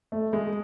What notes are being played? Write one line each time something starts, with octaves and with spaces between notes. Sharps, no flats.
A3
G#3